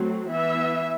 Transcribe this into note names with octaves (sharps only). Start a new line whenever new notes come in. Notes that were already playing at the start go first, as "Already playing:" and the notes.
Already playing: F#3 A3 C4
E3 B3 E5